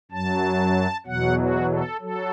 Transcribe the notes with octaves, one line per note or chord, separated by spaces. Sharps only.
F#2 F#3 A5
E2 B2 F#3 F#5
F#4
A4
F#3 A4